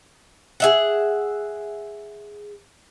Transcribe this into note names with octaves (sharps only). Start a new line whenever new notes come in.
G#4 E5 F#5